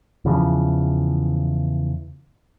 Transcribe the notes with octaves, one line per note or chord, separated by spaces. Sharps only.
E2 C#3 E3 F3